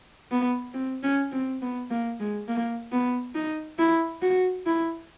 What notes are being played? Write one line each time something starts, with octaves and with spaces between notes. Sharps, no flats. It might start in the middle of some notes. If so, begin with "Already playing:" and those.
B3
C4
C#4
C4
B3
A#3
G#3
A#3
B3
D#4
E4
F#4
E4